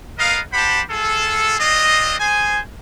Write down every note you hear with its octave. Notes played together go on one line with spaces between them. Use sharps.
B3 A#4 D#5 F5
G4 C5 F#5 A5 B5
F4 G#4 A4
C4 D4 F4 D#5
G#4 C5 G#5